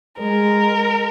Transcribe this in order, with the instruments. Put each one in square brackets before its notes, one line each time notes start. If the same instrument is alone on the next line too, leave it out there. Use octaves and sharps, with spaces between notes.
[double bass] G#3 [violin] A#4